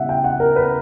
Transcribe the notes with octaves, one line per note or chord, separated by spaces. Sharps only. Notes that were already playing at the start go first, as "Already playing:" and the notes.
Already playing: C#3 G3 B3 E4 E5 F#5
G5
F#5
A#4
B4